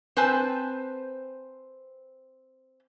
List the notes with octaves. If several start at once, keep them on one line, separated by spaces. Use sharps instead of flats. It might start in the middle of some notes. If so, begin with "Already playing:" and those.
C4 B4 C5 G#5 A5